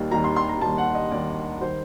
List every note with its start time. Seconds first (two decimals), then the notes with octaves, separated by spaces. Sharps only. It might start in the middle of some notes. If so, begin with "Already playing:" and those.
Already playing: D#2 D#3 G3
0.11 D#2 D#3 G3 A#5
0.24 C6
0.36 C6
0.49 A#5
0.61 D#2 D#3 G3 A5
0.78 F#5
0.95 D#5
1.12 D#2 D#3 G3 D5
1.61 D#3 G3 C5